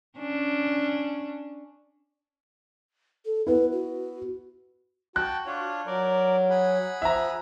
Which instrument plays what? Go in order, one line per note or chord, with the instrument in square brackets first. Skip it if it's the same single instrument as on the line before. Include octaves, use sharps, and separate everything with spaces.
[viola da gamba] C#4 D4
[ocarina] A4
[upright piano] B3 E4 [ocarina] B4
[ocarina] F#4
[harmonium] F#4 [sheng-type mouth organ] G5 A5 [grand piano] F#6
[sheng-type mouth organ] D4 F4 C#5
[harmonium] F#3 [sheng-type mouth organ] A#4 D5
[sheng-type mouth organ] G#4 F#5 B5
[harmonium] F3 [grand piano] E5 A#5